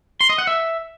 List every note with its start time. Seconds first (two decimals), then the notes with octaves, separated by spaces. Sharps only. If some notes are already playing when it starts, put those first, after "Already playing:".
0.21 C6
0.29 D#5
0.38 F#5
0.47 E5